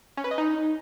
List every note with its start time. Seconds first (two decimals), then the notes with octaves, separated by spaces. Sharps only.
0.17 C#4
0.24 B4
0.31 D#5
0.38 D#4